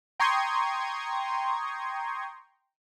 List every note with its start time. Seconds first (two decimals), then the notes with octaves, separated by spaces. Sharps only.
0.20 G5 A#5 C6 C#6 D#6 G#6